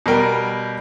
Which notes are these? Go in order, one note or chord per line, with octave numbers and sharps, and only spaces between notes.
B2 G3 A#4 G5